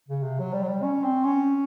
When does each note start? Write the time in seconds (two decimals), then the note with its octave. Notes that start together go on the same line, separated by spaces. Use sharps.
0.09 C#3
0.23 C3
0.39 F#3
0.53 G3
0.63 F#3
0.68 G3
0.83 C#4
1.04 C4
1.25 C#4